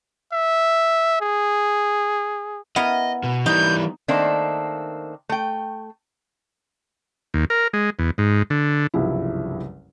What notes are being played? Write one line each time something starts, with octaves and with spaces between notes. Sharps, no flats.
E5
G#4
B3 E4 A#4 D#5
B2
E3 G3 D#4 G6
D#3 A3 A#3 C4 D4
A3 G5
D#2
A#4
G#3
E2
G#2
D3
F#1 C2 G2 F3 E4